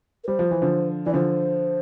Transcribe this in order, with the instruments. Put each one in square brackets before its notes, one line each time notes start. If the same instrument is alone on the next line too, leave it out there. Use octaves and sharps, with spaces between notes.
[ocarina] A#4
[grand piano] G3 [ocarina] C5
[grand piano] F3
E3
D3 F3
[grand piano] E3 [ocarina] D5
[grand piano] D3 F3 [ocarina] C5